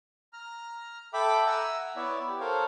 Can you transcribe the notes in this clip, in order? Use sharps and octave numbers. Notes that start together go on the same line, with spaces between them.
A#5 F6
A4 E5 G5 B5 D6
E5 F#5 G#5 A#5 E6
B3 E4 C#5 D5 E5
G4
A4 A#4 C5 C#5 F5